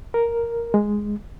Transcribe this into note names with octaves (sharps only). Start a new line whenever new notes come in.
A#4
G#3